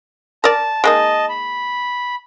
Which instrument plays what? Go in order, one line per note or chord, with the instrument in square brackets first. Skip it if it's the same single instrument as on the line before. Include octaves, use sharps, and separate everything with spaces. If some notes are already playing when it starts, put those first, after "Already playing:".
[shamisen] A#4 D5 [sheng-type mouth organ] A5
[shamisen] G#3 A#3 D#4 [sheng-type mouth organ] D#5 A5
[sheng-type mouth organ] B5